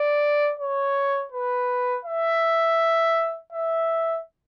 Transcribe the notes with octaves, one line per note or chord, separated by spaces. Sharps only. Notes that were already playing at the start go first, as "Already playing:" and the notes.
Already playing: D5
C#5
B4
E5
E5